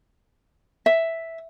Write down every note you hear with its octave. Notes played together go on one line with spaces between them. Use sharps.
E5